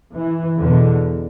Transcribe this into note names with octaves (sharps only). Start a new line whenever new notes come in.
E3
E2 B2 D3